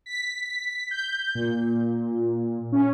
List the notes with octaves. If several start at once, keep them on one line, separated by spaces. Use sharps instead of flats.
B6
G6
A#2
C#4